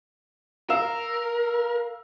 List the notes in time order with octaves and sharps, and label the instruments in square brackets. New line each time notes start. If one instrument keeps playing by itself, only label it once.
[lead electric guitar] A#4 [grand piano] F5 E6 E7